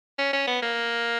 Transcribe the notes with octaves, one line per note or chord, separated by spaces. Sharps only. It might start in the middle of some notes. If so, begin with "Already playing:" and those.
C#4
C#4
B3
A#3